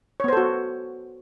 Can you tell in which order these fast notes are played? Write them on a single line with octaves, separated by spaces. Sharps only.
C#5 B3 C5 A4 F#4